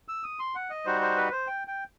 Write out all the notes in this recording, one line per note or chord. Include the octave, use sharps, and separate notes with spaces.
E6
D#6
C6
F#5
D#5
G3 D#4 F#4 C5
C5
B4
C5
G5
G5